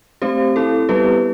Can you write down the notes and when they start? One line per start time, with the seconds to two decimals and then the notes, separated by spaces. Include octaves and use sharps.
0.22 A3 C4 G4 C5
0.56 C4 E4 A4
0.89 G3 B3 E4 G4 B4